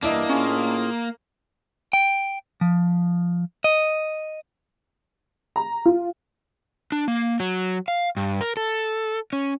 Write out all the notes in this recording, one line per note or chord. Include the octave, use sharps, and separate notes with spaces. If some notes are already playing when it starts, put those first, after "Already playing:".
G2 E3 G3 A#3 D4 E4 D#5
A2 C#4 F4 G#4
G5
F3
D#5
A#5
F4
D4
A#3
F#3
F5
G2
A#4
A4
C#4